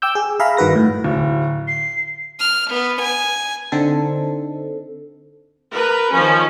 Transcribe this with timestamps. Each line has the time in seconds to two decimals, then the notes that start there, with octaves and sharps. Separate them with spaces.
0.02 G5 D6 E6 G6
0.15 G#4
0.39 G#4 E5 F5 A#5 B5
0.57 G2 D#3 F#4 B4 A#6
0.75 A2
1.04 D1
1.67 C7
2.40 F6
2.70 B3
3.01 G#5
3.72 D3 C4 D#4 A4
5.75 A#4 B4
6.12 D#3 F3 C#4